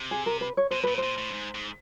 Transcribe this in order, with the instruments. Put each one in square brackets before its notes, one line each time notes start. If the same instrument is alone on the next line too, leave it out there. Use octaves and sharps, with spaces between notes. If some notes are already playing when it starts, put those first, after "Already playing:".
Already playing: [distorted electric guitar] C3
[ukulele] G#4
A#4
B4
C#5
[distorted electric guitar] B2 [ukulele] C5
[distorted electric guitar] A#2 [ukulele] B4
[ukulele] C5
[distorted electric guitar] A#2
A2
G2
G#2
G#2